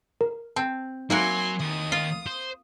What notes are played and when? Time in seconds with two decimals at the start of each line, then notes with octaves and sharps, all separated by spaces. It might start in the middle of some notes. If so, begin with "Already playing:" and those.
0.21 A#4
0.56 C4 A5
1.10 F#3 A#3 D#4 E4 F#4 G#5 C6
1.60 D#2 D#6
1.92 F4 C7
2.27 C5